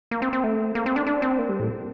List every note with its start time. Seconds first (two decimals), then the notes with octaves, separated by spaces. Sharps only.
0.11 A#3
0.22 C4
0.33 C4
0.43 A3
0.75 A#3
0.86 C4
0.96 D4
1.07 D4
1.22 C4
1.39 A#3
1.49 G3
1.60 A2